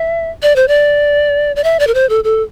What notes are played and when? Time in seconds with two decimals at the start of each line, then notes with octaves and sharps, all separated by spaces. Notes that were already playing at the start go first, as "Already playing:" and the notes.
Already playing: E5
0.42 D5
0.56 C5
0.68 D5
1.56 D5
1.64 E5
1.80 D5
1.87 A#4
1.94 C5
2.09 A4
2.24 A4